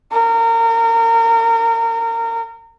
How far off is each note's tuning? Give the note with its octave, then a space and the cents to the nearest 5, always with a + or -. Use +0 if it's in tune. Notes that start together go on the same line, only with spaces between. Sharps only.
A#4 -30